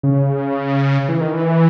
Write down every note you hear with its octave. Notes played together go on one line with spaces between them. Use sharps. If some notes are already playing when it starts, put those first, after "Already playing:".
C#3
E3
D#3
E3